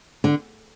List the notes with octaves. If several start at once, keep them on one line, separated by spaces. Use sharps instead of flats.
D3